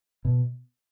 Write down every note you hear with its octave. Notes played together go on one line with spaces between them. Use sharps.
B2